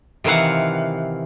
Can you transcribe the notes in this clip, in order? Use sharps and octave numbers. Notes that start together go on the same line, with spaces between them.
C3 D#3 E3 F5 F#5